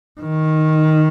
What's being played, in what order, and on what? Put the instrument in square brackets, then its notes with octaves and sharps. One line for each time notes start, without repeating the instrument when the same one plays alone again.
[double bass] D#3